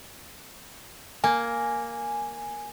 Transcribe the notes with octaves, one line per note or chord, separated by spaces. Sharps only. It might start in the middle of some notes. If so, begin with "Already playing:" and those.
A#3 G#5